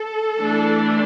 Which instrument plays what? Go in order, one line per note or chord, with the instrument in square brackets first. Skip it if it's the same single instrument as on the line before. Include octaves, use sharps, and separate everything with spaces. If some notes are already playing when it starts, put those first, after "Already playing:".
Already playing: [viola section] A4
E3 A3 D4